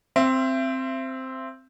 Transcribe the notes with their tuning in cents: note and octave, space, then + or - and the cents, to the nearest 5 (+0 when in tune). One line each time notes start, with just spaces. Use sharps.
C4 +0 E5 +35